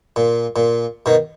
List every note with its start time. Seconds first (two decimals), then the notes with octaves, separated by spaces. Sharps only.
0.16 A#2
0.56 A#2
1.06 B2 D#3